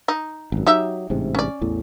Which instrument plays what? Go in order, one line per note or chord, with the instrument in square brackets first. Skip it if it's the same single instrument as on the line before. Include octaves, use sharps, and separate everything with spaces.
[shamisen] D#4
[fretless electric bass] G#1 F#2
[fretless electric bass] F#3 [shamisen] D#4 G4 E5
[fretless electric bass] A1 G#2 C3
[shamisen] C#4 D5
[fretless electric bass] A1 E2 A2